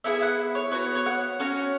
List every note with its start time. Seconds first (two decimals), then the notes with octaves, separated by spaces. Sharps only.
0.04 B3 E4 G#4 E5
0.22 F#5
0.55 C#5
0.72 B3 F#4 C#5
0.95 C#5
1.06 F#5
1.40 C#4 F#4 C#5